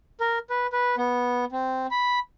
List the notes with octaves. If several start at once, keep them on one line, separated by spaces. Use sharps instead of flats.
A#4
B4
B4
B3
C4
B5